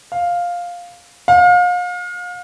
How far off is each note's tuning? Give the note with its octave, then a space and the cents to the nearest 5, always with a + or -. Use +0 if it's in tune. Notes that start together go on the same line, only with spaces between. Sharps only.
F5 +5
F5 +35